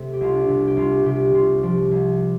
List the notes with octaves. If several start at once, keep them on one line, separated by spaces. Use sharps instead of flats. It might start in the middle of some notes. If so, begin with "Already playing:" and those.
Already playing: C3 A3 A4
G4
C2 F4
D4
C3
G4
C2 F4
C3 G4
C3 F4
F3 G4
C2